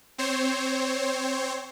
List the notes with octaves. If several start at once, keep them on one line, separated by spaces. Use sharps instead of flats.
C4 C5 C#5